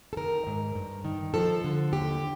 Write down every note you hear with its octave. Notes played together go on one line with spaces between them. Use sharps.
A4
D#3 A#4
G#2
G2
D#3
F3 A4
D3
D#2 G4